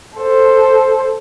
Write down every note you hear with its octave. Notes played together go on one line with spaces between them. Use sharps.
A4 C5